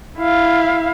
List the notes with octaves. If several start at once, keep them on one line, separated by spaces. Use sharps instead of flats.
E4 F5